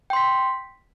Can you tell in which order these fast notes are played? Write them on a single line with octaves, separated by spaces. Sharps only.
G5 C6 B6